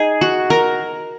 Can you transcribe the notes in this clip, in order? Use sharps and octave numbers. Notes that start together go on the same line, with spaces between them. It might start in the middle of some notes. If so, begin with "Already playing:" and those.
Already playing: D#4 G#4
F#4
A#4